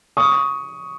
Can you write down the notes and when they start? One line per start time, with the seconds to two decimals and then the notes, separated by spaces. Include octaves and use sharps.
0.17 C#6 D#6